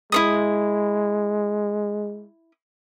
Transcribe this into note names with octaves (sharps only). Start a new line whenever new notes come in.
G#3 E4 C#5 D#6